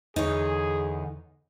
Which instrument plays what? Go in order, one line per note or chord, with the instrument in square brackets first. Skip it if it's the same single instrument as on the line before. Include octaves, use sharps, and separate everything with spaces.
[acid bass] E2 [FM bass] D3 [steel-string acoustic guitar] D#4 C#5 [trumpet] G#4